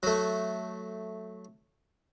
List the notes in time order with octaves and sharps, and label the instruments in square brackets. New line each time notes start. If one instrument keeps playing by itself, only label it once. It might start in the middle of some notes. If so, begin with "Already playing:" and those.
[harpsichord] F#3 A3